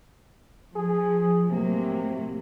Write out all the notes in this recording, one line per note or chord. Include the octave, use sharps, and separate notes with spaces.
F3 G#4
A2 C3 F#3 A#3